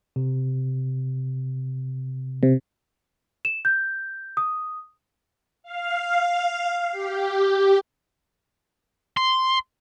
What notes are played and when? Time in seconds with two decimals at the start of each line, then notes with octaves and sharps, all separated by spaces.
0.16 C3
2.43 C3
3.45 E7
3.65 G6
4.37 D#6
5.63 F5
6.91 G4
9.17 C6